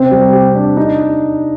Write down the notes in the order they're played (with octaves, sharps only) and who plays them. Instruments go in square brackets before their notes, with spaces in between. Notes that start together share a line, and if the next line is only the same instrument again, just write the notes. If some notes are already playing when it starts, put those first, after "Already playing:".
Already playing: [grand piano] C3 [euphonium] C4
[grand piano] G3
G4
D4
D#4